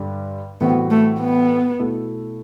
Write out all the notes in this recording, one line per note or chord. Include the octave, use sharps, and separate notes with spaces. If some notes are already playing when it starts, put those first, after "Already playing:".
Already playing: G2 D3 G3
A2 E3 G3 B3 C4 F#4
A3
B3
B2 A3 E4 A4